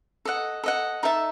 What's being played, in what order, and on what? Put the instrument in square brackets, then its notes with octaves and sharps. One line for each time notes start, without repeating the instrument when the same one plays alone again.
[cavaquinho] A4 D#5 F#5
A4 D#5 F#5
D#4 A4 E5 A5